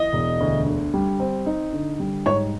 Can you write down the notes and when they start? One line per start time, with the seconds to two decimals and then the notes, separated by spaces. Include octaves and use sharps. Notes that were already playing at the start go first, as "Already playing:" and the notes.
Already playing: E3 D#5
0.13 E1
0.41 D2
0.66 D3
0.94 G3
1.20 C4
1.46 D#4
1.73 D3
2.00 G3
2.26 G#2 C#5